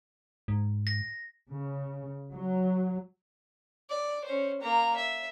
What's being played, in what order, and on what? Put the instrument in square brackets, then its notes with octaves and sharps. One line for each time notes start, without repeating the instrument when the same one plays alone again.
[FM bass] G#2
[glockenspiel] A#6
[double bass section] C#3
F#3
[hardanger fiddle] D5
C#4 C5
A#3 A#5
E5